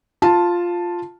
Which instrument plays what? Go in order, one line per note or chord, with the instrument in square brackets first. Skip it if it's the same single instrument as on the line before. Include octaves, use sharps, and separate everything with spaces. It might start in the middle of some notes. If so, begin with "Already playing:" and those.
[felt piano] F4 A5